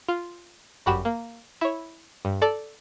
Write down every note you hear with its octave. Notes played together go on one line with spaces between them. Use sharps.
F4
G1 F#2 F#4 G4 B5 E7
A#3
E4 C#5
G2
A4 D5 A5